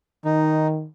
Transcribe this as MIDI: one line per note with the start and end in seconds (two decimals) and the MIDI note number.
0.25 0.87 51
0.25 0.67 63